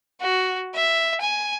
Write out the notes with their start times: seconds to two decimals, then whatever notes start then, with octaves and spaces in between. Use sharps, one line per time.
0.20 F#4
0.75 E5
1.21 G#5